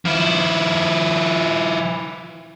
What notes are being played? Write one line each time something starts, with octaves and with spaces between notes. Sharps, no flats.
F3 E4